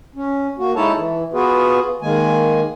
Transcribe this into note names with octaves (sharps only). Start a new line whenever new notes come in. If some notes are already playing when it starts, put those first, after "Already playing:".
C#4
A#3 F#4
G#3 D#4 E4 A4 C#5 A5
E3
B3 F4 F#4 G#4 B4
D#3 G#3 A#3 G#5